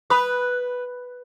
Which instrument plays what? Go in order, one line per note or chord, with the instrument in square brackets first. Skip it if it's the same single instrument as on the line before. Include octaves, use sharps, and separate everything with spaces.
[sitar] B4 [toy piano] B5 D#6